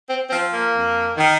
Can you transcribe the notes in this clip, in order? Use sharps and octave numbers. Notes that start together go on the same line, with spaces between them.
C4
F3 C4
A#3
F2
D#3